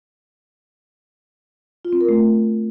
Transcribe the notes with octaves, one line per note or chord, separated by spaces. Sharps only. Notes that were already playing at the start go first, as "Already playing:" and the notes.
F4
C4
A#4
A3